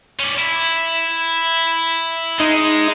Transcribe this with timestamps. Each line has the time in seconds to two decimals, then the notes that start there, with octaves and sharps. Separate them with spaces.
0.19 C#4 D5
0.38 E4
2.40 G#3 D#4